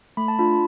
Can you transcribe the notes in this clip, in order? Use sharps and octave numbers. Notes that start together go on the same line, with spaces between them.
A3 B5
A5
D4 F4 B5